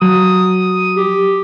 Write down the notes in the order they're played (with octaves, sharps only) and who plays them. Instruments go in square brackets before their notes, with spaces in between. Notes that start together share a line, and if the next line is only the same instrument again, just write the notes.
[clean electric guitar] F#3 [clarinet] D#6
[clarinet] G4